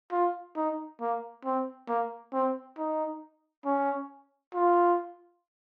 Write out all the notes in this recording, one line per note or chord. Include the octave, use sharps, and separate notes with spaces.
F4
D#4
A#3
C4
A#3
C4
D#4
C#4
F4